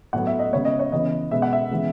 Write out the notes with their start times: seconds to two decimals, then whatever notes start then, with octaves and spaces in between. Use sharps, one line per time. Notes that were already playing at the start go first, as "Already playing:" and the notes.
0.13 A2 F#3 B3 F#5
0.27 E5
0.39 D#5
0.53 C#3 G#3 B3 C#5
0.65 D#5
0.79 C#5
0.92 C#3 E3 B3 D#5
1.31 B2 G#3 B3 E5
1.42 F#5
1.53 E5
1.71 C#3 E3 G#3 B3